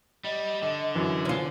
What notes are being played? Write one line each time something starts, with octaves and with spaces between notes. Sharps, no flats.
G3 D#5
D3 E7
F#2 E3
C#4 F4 C5